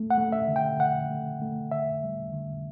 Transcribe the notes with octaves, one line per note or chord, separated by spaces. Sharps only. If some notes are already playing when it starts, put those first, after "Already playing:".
Already playing: A3
F#5
A3
E5
D3
G5
D3 F#5
A3
A3
D3 E5
G3
D3